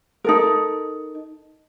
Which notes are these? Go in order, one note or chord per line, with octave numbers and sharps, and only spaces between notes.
D#4 A4 A#4